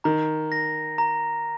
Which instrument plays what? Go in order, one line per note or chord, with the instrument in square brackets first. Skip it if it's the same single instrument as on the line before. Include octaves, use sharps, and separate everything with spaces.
[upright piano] D#3 [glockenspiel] A#5
[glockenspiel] A#6
A#5